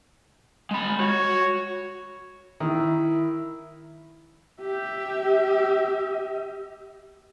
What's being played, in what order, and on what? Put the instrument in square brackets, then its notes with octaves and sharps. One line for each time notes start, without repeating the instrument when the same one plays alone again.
[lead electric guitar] G#3 B5
[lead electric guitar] F#4 [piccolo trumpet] C#5
[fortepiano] D#3 [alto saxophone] E4
[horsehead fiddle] G4 E5